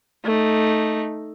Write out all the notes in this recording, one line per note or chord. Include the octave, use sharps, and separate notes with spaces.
A3 D#4